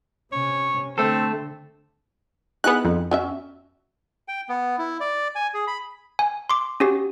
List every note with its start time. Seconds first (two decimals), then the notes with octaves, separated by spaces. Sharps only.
0.32 C3 C#4 C#5
0.98 D3 A3 C4 A4
2.64 B3 D#4 E4 G#4 F#6
2.85 F2
3.11 F#3 C#4 E5
4.28 G5
4.49 B3
4.78 E4
5.00 D5
5.35 G#5
5.54 G#4
5.67 B5
6.19 G#5
6.49 C6 D6
6.80 C#4 F#4 G4